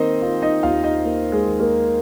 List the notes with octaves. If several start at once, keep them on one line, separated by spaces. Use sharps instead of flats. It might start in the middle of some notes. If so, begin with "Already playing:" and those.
Already playing: D#3 A#3 C4 D#4 C5 D#5
D#4 F4
D#4 D#5
D#2 F4 F5
D#4 D#5
A#3
G#3 G#4
D#3
A#3 A#4